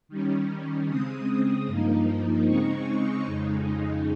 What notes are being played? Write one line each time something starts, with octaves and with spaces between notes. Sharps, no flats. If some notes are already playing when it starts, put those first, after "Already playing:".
D#3 G3 C#4
C#3 G#3 C4 D#6
G2 F3 A#3 D#4
C#3 G#3 C4 D#4 C#6
F2 C#3 G#3 D#4